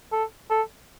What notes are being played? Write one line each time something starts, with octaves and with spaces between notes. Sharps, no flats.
A4
A4